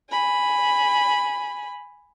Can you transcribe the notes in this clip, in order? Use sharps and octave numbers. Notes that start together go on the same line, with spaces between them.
G#5 B5